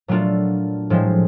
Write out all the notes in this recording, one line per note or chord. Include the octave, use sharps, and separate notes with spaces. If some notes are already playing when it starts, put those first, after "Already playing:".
A#2 F#3 A3 D4 F4
A2 F3 G#3 C4